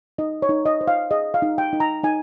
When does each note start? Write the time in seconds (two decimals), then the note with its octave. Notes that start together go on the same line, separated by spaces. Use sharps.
0.18 D#4 D#5
0.42 C#5
0.49 D#4
0.66 D#5
0.81 C5
0.88 F5
1.11 G#4 D#5
1.34 F5
1.42 D#4
1.58 G5
1.73 D#4
1.80 A#5
2.03 D#4 G#5